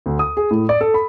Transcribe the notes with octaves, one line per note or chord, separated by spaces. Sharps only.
D2
D#6
G#4
A2
D5
A4
B5